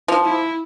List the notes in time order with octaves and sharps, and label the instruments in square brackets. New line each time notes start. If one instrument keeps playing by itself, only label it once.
[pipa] F3
[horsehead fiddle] E4